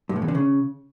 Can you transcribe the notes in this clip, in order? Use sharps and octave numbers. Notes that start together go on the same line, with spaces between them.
G2
A2
E2
D3
C#3